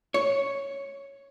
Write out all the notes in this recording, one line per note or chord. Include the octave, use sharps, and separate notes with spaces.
C#5